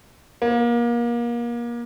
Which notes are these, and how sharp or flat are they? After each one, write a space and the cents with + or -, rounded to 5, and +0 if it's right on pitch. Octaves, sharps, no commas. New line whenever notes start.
A#3 +30